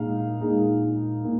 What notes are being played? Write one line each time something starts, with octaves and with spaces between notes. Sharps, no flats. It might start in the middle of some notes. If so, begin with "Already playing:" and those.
Already playing: A#2 G#3 D#4 F5
A#2 G#3 D#4
A#2